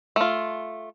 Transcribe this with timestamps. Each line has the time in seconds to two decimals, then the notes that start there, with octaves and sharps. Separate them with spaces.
0.16 A3 F4